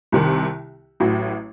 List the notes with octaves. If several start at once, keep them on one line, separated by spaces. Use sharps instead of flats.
C2 C3 D#3
A1 A2 F#3